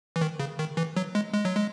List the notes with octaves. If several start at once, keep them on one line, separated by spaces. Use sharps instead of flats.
E3
D#3
C#3
D#3
E3
F#3
G#3
G#3
F#3
G#3